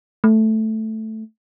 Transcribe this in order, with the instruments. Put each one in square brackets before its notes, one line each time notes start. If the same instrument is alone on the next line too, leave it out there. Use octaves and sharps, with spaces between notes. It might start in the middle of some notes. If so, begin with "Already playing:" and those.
[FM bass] A3